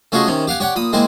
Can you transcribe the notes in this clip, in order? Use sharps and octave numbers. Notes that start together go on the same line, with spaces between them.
A3 C#4 F4 F#4 G#4 D#5
C3 D#3 C#4
G4 F5 F#5 G#5
G4 C#5 D5 F#5
A#2 B5 D#6
G#3 A#3 C4 E4 G#4